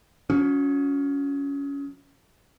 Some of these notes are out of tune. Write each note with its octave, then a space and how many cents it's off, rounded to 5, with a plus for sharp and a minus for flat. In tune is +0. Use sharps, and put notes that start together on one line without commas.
F#3 -35 C#4 +20